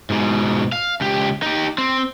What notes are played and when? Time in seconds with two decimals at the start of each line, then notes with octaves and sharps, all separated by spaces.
0.10 G#2 B2
0.72 F5
1.01 C#2 G4
1.43 D#4 G4
1.78 C4